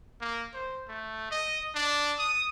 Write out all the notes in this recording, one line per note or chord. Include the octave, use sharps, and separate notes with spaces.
A#3
C5
A3
D#5
D4
D#6